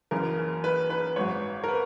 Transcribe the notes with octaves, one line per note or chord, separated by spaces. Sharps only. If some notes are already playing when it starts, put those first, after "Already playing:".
F#1 F#2 C#3 E3 A#4
B4
B4
G#1 G#2 F#3 C#5
A#4
B4